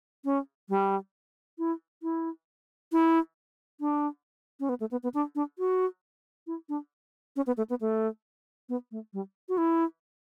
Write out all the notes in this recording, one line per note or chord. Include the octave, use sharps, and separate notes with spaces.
C#4
G3
E4
E4
E4
D4
C#4
B3
A3
B3
B3
D4
D4
F#4
E4
D4
C#4
B3
A3
B3
A3
B3
A3
G3
F#4
E4